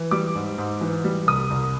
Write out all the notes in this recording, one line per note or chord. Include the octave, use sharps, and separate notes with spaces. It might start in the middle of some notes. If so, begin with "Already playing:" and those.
Already playing: E3
G3 D6
G#2
G#2
E3
G3
C2 D#6
C2